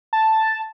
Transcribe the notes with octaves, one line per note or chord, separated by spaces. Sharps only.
A5